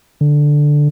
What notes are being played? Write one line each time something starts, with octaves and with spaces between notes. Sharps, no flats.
D3